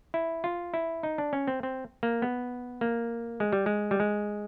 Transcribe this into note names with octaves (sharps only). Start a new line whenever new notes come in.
E4
F4
E4
D#4
D4
C#4
C4
C4
A#3
B3
A#3
G#3
G3
G#3
G3
G#3